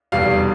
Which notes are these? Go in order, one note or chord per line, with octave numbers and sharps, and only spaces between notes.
F1 E2 B2 G3 F5